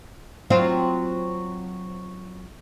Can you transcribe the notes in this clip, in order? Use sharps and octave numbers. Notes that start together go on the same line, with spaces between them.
F#3 C4 F4